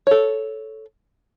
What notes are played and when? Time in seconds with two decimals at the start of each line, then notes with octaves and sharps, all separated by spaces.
0.07 A4 C#5